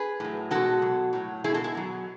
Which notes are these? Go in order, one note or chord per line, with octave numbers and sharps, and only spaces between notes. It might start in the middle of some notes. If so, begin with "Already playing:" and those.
Already playing: G#4 B4
A2 F#3
B2 G#3 F#4 A4
B2 F#3
A2 F#3
B2 G#3 E4 G#4
F#4 A4
E4 G#4
B2 F#3